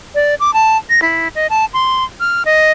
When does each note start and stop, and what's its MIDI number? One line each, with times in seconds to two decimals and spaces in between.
0.15 0.35 74
0.40 0.53 86
0.53 0.77 81
0.89 1.00 94
1.02 1.28 64
1.35 1.47 75
1.50 1.65 81
1.73 2.04 84
2.20 2.43 89
2.45 2.72 75